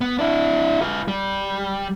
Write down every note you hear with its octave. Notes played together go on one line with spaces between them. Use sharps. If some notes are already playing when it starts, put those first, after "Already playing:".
B3
D4 E4
F4 B4
G3